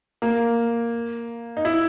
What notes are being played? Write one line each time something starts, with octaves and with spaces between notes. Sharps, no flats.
A#3
D#4
E4